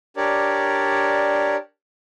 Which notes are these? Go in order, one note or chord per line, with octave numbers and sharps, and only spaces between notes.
D4 G4 A#4 C#5 D5